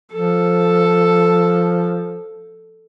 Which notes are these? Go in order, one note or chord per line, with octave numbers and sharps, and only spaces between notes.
F3 A4